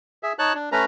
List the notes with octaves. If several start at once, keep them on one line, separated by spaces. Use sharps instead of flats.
G#4 E5
D#4 C#5 A5 F#6
D4
A3 C#4 B4 A#5